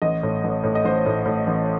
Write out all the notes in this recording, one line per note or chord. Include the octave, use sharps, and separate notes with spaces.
A1 D#5
A2
A1
A2
D#5
A1 C5
A2
A2
A1